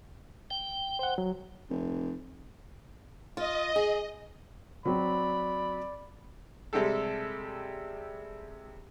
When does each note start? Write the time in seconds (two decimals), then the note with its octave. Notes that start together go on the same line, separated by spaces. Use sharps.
0.51 G5
0.99 C5 F#5
1.18 F#3
1.70 F1
3.37 F4 D#5
3.76 G#4
4.85 F#3 C4 D5 B5
6.73 C3 G3 G#3 G4 A4